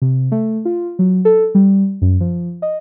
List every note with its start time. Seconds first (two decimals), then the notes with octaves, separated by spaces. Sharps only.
0.02 C3
0.32 A3
0.65 F4
0.99 F#3
1.25 A4
1.55 G3
2.02 F#2
2.20 F3
2.62 D#5